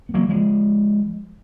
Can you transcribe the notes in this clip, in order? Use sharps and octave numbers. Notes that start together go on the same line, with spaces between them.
B3
F#3 A#3
F3 G#3